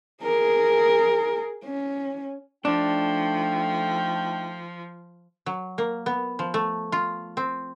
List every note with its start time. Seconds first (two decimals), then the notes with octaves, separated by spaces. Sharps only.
0.24 G#4 A#4
1.65 C#4
2.65 F3 A3 D4 D#4 G5
5.46 F#3
5.78 A#3
6.06 B3
6.39 F3
6.54 A3
6.92 F4
7.37 C4